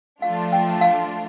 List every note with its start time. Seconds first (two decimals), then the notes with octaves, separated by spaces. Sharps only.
0.22 F3 A3 D4 F4 F5
0.53 G5
0.81 F5